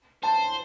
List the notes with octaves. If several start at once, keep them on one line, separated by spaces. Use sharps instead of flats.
C5 A5